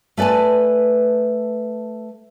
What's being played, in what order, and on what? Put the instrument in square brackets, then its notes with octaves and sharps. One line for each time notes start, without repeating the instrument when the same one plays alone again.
[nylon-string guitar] A3 B4 D5 G#5 A5